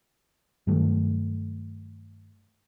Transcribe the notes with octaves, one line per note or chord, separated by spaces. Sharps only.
G2 D#3 F#3 A3